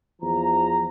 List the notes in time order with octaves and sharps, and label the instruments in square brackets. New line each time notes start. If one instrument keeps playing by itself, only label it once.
[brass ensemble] E2 F3 A#5